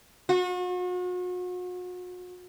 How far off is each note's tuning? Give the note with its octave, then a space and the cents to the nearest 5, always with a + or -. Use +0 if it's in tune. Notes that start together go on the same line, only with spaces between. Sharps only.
F#4 -40